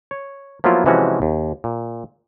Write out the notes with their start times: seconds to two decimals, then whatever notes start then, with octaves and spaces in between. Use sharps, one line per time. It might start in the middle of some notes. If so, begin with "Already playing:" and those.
0.11 C#5
0.64 F3 F#3 A#3 B3 E4 F4
0.86 C3 E3 F3 G#3 C#4 F#4
1.22 D#2
1.64 A#2